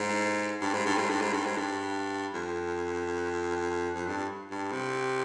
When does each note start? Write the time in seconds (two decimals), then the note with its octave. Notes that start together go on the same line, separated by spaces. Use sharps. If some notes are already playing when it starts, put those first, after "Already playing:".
Already playing: G#2
0.62 G2
0.74 G#2
0.86 G2
0.98 G#2
1.10 G2
1.22 G#2
1.33 G2
1.46 G#2
1.57 G2
2.34 F2
3.95 F2
4.07 G2
4.51 G2
4.72 C3